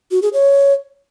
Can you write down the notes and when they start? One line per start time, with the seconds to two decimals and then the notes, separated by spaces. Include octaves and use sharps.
0.11 F#4
0.22 G#4
0.33 C#5